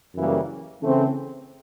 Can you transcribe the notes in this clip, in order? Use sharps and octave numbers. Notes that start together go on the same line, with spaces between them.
F#2 C#3 E3 G3 A#3
C#3 E3 A3 C4